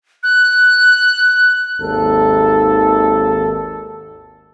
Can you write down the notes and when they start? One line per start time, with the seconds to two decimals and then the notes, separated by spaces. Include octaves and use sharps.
0.23 F#6
1.81 G#1 D#2 A4